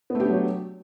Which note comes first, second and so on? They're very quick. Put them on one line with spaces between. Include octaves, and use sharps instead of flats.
B3 A3 G4 D4 F#3